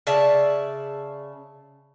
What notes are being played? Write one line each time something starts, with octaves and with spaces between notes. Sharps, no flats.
C#3 D5 E5 A5